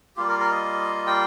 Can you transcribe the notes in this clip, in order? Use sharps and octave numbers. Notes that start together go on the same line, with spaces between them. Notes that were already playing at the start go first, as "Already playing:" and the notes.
G3 A#3 F4 G4
A#4
A#4
D#5
G5